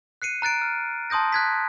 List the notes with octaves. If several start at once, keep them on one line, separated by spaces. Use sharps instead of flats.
F#6 C7 C#7 D#7
A#5 F#6 A6 D7
F6
A5 C6 D#6 G6 A#6
F#6 G#6 B6